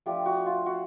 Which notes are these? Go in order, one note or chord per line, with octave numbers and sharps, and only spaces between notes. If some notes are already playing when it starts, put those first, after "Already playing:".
F3 A3 D4 G4
F#4
F4
F#4